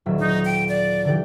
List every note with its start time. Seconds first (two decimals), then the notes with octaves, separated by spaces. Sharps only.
0.06 D#1 F#3 E5
0.19 D#4
0.45 G5
0.69 D5
1.05 D3 E3 G4